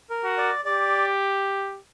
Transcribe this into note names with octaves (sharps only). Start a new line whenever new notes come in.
A#4
F#4
D5
G4 D5